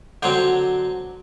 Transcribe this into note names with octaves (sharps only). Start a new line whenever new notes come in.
D3 F#3 C4 C5